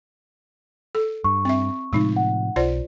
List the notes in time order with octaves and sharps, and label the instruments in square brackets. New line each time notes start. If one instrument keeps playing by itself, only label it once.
[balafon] A4
[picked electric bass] G2 [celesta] C#6
[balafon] C4 E5
[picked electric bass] A2 C3 F3 [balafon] G#3 D#4
[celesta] F#5
[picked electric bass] B1 [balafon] F4 C5 D5